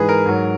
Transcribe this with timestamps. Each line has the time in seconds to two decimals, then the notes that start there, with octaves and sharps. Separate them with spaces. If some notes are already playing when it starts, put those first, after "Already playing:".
Already playing: G#2 E3 G#3 G#4 B4
0.09 A#4
0.26 G#2 F#3